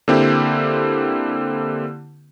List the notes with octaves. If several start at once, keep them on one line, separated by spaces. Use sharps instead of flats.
D3 A#3 C4 E4 G4